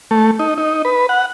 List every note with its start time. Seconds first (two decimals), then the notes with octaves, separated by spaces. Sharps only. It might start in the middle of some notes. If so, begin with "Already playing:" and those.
0.11 A3
0.39 D#4
0.58 D#4
0.85 B4
1.09 F#5